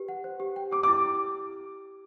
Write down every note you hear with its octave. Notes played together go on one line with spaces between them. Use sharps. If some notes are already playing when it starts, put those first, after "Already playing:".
Already playing: G4 B4
F#5
C5
G4
G5
G4 D6
E4 D6